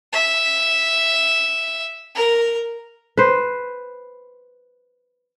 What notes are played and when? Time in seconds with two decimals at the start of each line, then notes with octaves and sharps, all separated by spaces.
0.13 E5
2.15 A#4
3.17 B4 C5